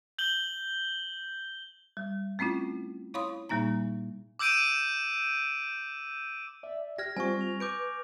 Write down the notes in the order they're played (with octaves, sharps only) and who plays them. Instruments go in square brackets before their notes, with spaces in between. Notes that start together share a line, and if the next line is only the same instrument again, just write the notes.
[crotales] G6 F#7 G7
[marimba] G3
A3 C4 C#4 E4 F4
E4 C#5 F5 B5 C6 D#6
A#2 G3 A#3 D#4 A#5
[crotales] D6 E6 G6 D7 D#7
[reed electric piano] D5 E5
[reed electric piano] G4 [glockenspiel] F6 G#6 A#6
[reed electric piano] G3 C4 F4 [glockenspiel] G#5 C#6
[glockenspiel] F7
[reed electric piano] B4 [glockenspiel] D6 G6 D7